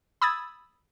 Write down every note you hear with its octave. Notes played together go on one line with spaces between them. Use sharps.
B5 D#6 E6 G#6 A6